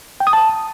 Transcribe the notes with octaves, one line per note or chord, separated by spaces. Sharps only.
G5
D#6
A5